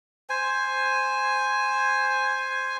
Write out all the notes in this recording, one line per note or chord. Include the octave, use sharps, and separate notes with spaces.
C5 G#5